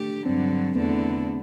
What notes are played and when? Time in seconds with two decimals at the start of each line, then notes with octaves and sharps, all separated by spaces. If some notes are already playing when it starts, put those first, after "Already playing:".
Already playing: A3 D4 G4
0.25 G2 D3 F#3 C4
0.75 E2 D3 A3 B3 E4